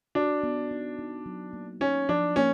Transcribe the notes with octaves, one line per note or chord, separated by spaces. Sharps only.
D4 F#4
B3
D#4
D#4
F#3
A#3
C#4 D#4
F3 D4
A#3 C#4